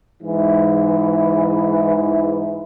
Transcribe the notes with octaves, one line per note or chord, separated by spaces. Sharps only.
G#2 E3